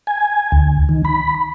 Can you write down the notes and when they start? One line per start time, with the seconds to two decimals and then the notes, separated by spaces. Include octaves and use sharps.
0.07 G#5
0.52 D2
0.89 D#3
1.05 B5